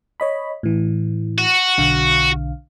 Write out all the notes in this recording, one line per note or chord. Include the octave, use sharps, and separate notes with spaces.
C#5 D#5 B5
A2 E3
F#4
B1 D3 F5